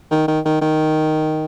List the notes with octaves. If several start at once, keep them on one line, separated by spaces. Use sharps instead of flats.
D#3
D#3
D#3
D#3